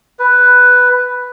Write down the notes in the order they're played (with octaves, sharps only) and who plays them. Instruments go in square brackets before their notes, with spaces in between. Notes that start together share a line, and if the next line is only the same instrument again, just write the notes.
[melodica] B4